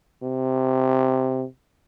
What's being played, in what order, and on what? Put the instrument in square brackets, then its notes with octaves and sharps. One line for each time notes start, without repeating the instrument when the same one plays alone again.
[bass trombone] C3